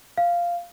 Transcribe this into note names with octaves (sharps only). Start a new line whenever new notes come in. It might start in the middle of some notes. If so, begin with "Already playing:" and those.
F5